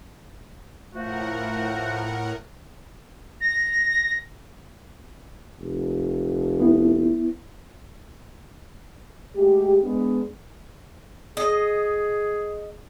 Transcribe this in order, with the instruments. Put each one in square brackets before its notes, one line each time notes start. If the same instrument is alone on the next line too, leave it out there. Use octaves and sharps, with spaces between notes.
[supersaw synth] A2 A#4 F#5 [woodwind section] F3 A3 F#4
[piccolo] A#6
[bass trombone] F1
[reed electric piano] B3 E4
[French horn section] G#3 A3 F#4 G4
G#3 B3 D4
[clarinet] G#4 [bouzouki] D#5